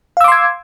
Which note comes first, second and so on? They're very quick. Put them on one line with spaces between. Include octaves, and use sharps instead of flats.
F5 E6 D6 C6 G#6